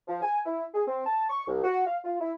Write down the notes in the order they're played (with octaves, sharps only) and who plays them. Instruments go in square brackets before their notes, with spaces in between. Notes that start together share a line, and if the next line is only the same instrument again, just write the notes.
[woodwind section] F3
G#5
E4
G#4
C4
A5
C#6
C2
F#4
F5
F4
E4